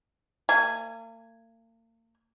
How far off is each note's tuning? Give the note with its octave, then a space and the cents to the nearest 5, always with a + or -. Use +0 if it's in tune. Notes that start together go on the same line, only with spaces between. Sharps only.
A#3 -40 G#5 -5